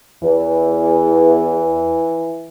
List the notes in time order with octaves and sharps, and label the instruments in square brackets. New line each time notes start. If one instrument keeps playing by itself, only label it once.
[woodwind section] E2 [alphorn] E3